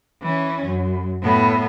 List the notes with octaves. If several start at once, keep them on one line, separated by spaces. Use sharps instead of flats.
E3 C#4
F#2
A2 B3